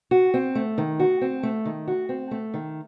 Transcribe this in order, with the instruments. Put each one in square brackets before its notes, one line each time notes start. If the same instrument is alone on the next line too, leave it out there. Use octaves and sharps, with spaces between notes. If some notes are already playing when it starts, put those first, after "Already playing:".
[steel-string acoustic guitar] F#4
C4
A3
D#3
F#4
C4
A3
D#3
F#4
C4
A3
D#3